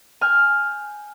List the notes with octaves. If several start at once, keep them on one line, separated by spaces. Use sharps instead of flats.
G#5 F6 G6